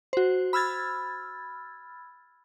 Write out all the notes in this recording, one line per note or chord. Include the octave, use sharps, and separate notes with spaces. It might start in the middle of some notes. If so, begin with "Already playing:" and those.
F#4 C5
B5 E6 F6 G#6 A6